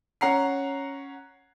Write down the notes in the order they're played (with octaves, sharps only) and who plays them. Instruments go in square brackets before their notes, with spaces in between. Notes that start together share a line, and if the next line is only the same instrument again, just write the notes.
[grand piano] C#4 F#5 A#5 C7